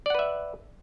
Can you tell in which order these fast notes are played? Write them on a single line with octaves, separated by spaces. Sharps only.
D5 F#5 B4 E5